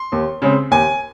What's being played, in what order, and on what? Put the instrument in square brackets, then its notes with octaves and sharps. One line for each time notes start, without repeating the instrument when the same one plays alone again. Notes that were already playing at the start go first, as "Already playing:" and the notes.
Already playing: [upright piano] C6
D#2
C#3 G#3 C4
D#2 G#5